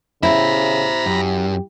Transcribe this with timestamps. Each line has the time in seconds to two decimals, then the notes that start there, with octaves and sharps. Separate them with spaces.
0.23 C#3 E4 C5 E5 A#5 B5
1.06 F#2 G4